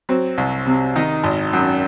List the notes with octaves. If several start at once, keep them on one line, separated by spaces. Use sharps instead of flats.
F#3 C4
C2
C3
D#3 D#4
G#1
F#2